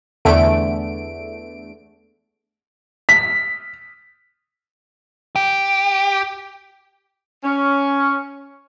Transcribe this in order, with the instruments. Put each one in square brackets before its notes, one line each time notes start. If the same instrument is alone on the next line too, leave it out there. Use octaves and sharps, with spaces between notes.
[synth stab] E2 D3 A3 D7
[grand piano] B6
[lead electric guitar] G4
[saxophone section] C#4